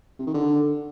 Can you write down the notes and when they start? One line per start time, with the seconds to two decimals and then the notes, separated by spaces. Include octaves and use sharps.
0.19 C3
0.27 D#3
0.34 D3